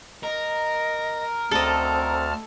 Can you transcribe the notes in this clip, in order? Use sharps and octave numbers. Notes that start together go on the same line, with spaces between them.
A#4 D#5
D2 C4 A4 D#5 A5 F6